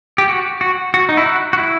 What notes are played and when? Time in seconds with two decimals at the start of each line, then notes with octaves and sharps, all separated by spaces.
0.18 G4
0.29 F#4
0.61 F#4
0.94 F#4
1.09 D#4
1.17 E4
1.26 F#4
1.53 F#4
1.58 E4